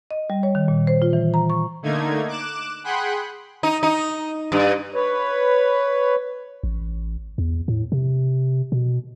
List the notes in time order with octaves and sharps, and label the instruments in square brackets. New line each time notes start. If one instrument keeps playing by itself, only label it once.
[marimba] D#5
G3
C#5
D#3
A#2
C5
F4
E3
A#5
C#6
[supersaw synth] D3 A3 A#3 D#4 G#6
D6 F#6 E7
G#4 F#5 G5 B5 C6 F#6
[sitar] D#4
D#4
G2
[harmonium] B4 C#5
[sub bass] A1
E2
A2
C3
B2